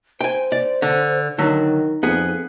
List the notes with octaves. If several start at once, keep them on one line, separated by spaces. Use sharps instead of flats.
C5 G5 G#5
D5
D3
D3 D#3 F#3 D#4
F2 B3 G#4